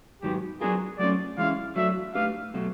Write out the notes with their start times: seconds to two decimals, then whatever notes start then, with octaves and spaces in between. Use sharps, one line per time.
0.22 G#2 D#3 F#3 B3 G4
0.61 F#3 B3 D4 F4 G#4 A#4
0.99 F#3 A3 C#4 F4 D5
1.38 E3 G#3 C#4 E4 F5
1.76 F#3 A3 D4 E5
2.15 A3 D4 G4 B4 F5
2.54 B2 F#3 A3